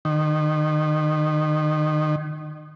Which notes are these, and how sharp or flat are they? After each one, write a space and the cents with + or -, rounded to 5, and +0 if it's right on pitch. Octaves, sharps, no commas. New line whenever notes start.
D#3 -30